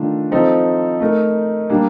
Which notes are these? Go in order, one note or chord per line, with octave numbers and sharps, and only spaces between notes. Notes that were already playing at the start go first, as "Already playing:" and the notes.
Already playing: D#3 A3 D4 F4
F3 C4 D#4 A4
A3 D#4 A#4
G3 A#3 D4